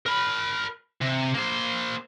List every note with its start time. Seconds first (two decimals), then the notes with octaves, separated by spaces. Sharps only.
0.06 A#4 B5
1.01 C3
1.34 A#3 C5